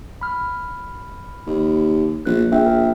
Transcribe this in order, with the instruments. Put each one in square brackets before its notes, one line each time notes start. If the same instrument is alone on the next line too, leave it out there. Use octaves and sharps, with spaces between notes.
[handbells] B5 F6
[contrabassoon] D#2
[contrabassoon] A#1 [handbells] F#6
[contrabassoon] A#1 [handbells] G#4 E5 G5
[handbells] A#4